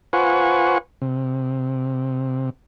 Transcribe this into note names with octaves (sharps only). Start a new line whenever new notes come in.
F4 B4 C5 F#5 G#5 C#6
C3